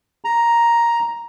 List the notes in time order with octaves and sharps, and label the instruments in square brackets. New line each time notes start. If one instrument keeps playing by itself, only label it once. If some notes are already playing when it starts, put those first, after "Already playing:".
[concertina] A#5